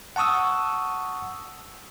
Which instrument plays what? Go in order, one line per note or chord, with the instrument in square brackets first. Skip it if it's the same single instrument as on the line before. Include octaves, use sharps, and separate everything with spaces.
[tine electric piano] F#5 A5 C#6 D#6 E6